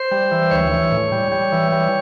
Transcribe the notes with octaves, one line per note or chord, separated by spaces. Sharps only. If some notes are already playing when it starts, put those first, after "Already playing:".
Already playing: C5
G3
E3
D2 C#5
E3
A2
G3
G3
E3
G3